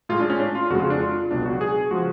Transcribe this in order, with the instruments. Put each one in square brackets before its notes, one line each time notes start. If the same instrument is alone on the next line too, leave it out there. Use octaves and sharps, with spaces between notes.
[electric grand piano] A2 G#3 F4
D4
C#4
D4
F4
F2 C#3 G#3 F#4
F4
D4
F4
C#2 B2 F#3 D4
F#4
G#4
C#3 F3 G#3 F#4